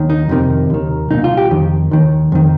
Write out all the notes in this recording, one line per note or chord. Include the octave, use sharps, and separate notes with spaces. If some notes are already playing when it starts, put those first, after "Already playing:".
Already playing: D#2 D#3
D#4
F2 C3 D#3
D#2 D#3
C2 A#2 D#4
F4
G4
F2 D#3
D#2 D#3
F2 D#3